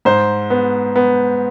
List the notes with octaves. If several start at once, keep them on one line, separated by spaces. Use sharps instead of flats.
G#2 C5
B3
B3